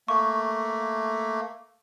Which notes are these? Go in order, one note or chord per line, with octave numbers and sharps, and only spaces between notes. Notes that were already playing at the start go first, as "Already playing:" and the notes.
A3 A#3 C#6